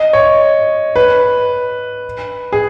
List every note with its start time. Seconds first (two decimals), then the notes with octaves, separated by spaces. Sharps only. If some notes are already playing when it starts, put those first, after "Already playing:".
Already playing: D#5
0.13 C#5
0.96 B4
2.53 G#4